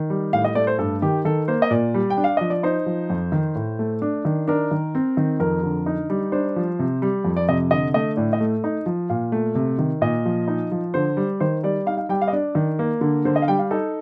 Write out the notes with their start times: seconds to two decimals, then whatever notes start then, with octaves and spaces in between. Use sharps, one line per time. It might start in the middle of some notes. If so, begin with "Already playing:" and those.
Already playing: D#3
0.10 G3
0.33 A2 F5
0.44 D#5
0.55 A3 D5
0.67 C5
0.78 G2 A4
1.02 D#3 G4
1.25 D#3 A4
1.48 A#3 C5
1.62 D#5
1.71 A#2 D5
1.94 G3
2.10 G5
2.17 D4
2.24 F5
2.37 F3 D#5
2.50 D5
2.63 D#4 C5
2.86 F3
3.10 F2
3.32 D#3
3.55 A2
3.79 A3
4.02 D4
4.25 D#3
4.48 D4 A#4
4.71 D#3
4.95 C4
5.17 D#3
5.40 F2 A#4
5.63 D3
5.86 D#4
6.10 G3
6.32 D4 C5
6.56 F3
6.79 C3
7.02 G3
7.24 F2
7.37 D5
7.49 C3 D#5
7.71 D3 D#5
7.94 A3 D#5
8.17 A2 D5
8.33 D#5
8.41 A3
8.64 D#4
8.86 F3
9.10 A#2 F5
9.32 A3
9.55 C3
9.79 D#3
10.01 A#2 D#5
10.25 F3
10.48 D#4
10.72 F3
10.94 D3 C5
11.17 G3
11.40 D#3 C5
11.63 G3 D5
11.86 D#4 F5
11.97 F5
12.09 G3 G5
12.22 F5
12.28 D#5
12.32 D4 D5
12.55 D#3
12.79 A#3
13.01 D3
13.25 D3 C5
13.36 D#5
13.42 F5
13.48 G3 G5
13.59 F5
13.71 D#4 A4